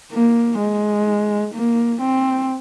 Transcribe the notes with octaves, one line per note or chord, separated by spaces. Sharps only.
A#3
G#3
A#3
C4